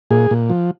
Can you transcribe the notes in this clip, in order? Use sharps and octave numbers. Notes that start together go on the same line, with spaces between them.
A#2 G#4
A#2
F3